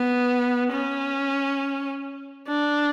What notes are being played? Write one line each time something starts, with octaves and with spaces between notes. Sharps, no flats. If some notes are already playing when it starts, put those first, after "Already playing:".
Already playing: B3
C#4
D4